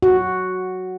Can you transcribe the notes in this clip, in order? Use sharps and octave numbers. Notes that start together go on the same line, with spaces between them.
F#4